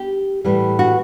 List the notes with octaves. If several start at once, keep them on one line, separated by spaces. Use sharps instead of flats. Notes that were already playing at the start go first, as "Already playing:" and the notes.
Already playing: G4
A2 E3 G3
F#4